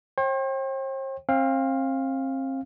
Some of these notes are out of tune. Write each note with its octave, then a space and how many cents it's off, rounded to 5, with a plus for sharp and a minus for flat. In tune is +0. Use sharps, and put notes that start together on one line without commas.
C5 +45 G5 +0
C4 +35 F5 +0